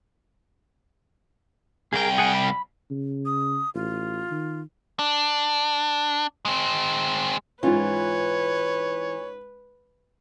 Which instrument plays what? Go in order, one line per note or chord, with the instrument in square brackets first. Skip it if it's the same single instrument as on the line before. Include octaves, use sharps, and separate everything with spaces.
[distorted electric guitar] C2 G5 [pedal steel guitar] G#4 A#4
[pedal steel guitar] G#4 F#5 G#5
B5
[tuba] C#3
[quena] D#6
[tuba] A1 [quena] F4
[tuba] D#3
[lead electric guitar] D4
G#3 C4
[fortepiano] G#2 C#4 [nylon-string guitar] E3 F4 [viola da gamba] B4 [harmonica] C#5